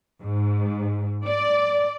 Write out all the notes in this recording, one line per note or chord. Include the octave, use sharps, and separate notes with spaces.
G#2
D5